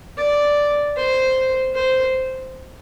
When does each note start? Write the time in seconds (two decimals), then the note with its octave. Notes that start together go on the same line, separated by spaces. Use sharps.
0.17 D5
0.96 C5
1.74 C5